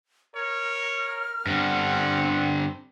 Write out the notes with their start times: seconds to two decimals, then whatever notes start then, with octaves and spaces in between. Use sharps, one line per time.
0.36 A#4 C#5 F6
1.47 G2 D3 C4 F#5